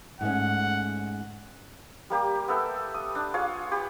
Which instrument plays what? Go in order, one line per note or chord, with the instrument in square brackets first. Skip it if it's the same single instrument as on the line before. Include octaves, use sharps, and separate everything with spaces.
[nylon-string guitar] G#2 A3 C#4 [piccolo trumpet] F#5
[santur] G3 A#3 G4
B3 A4 E5 G5
D#6
D4
F4 G#4 C#5 F5
G4 B5